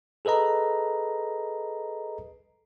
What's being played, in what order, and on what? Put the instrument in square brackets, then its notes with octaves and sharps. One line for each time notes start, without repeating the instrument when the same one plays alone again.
[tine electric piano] G#4 A4 B4 D#5 A#5